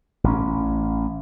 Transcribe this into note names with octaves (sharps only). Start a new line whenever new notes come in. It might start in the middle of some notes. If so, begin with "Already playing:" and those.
A1 C#4